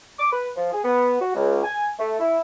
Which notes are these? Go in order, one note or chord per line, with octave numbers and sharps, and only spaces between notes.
D6
B4
F3
G#4
B3
F#4
C#2
G#5
A3
E4